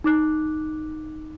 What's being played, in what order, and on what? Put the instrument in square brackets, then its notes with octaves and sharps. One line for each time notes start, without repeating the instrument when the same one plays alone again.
[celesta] D#4 D6 F#6